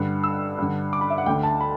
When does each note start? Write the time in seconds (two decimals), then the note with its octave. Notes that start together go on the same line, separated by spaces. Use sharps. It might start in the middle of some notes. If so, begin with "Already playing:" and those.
Already playing: G2 D3
0.23 E6
0.58 G2 D3
0.93 D6
1.01 B5
1.10 E5
1.18 F#5
1.26 D2 G5
1.29 D3
1.43 A5
1.61 B5